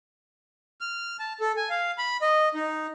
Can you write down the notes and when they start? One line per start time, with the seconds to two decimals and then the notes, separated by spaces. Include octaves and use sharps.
0.81 F6
1.19 A5
1.40 A4
1.57 G#5
1.70 F5
1.98 B5
2.21 D#5
2.55 D#4